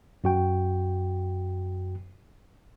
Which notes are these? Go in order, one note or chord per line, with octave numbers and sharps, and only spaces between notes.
F#2 F#4 G5